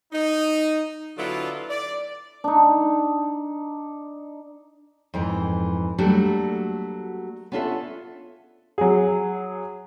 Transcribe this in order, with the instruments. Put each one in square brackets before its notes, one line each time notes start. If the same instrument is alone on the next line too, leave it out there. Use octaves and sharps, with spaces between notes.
[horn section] D#4
D3 F#3 B3 E4 F4 A4
D5
[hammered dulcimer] D4 D#4
[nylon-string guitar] F2 G#2 E3
F#3 G3 A3 A#3 D4 F#4
B3 C#4 D4 F4 A4 E5
[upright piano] F#3 G#4